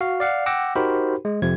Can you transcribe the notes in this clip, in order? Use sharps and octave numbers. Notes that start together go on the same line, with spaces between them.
F#4 F5
D5 F5 F#5
F#5 G5 D6 E6 A#6
D#4 F#4 G4 A#4 C5 B5
G#3
F2 C3 F3 G#6